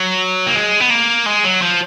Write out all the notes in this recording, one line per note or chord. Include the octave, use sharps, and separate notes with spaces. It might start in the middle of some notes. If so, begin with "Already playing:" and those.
Already playing: F#3
A#3
G#3
B3
A#3
G#3
F#3
F3